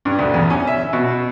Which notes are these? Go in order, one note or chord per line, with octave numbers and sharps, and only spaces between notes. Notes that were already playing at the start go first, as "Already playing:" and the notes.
G2
D2
E2
C#4
E5
B2